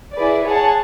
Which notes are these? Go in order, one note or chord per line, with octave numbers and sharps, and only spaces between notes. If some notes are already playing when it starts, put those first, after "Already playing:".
E4 G#4 B4 D5
G#4 C#5 F#5 A5